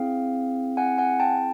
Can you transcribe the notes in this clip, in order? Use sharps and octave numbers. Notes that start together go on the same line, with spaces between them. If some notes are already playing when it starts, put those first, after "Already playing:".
Already playing: C4 E4 G#4 F5 G5
F#5 G#5
F#5 G#5
G5 A5